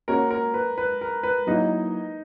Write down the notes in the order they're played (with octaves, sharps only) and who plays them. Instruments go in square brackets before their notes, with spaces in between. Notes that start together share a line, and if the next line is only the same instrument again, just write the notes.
[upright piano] A#3 C#4 F#4 C#5 [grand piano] A#4
[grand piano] A#4
B4
B4
A#4
B4
[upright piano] F#3 A#3 E4 [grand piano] D#4 D#5